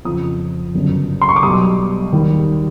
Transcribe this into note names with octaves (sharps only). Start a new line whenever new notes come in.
F2 C#3 F3 D#6
G1 F#2 C#3
C6
C#6
D6
B1 B2 G3 D#6
D#2 D#3 G3